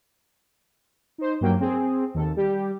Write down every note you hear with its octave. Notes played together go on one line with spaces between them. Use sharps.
D#4 C5
G2 F#3 A#3 G5
C4 G#4
D#2 A4
G3 G4